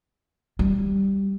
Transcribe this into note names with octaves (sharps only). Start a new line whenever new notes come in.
G3